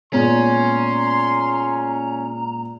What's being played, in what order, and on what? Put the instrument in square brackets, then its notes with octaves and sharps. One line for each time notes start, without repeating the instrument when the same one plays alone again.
[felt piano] A#2 G#3 B3 [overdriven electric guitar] C#4 [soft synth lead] A#5 [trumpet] C6